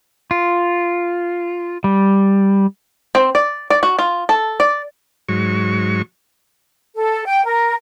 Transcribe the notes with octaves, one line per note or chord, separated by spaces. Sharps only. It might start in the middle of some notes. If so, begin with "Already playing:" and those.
F4
G3
C4
D5
D5
F#4
F4
A4
D5
G#2 F#3 C#6
A4
G5
A#4